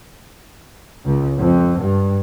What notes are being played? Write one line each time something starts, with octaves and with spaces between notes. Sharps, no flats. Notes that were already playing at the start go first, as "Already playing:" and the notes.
C#2
F2
G2